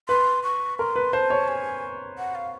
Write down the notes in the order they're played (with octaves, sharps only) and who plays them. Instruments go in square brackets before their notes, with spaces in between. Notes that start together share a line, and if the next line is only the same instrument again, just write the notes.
[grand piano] B4 [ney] C6
[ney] C#6
[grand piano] A#4 [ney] C6
[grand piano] B4
[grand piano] C5 [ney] A5
[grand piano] C#5
[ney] G#5
F#5
F5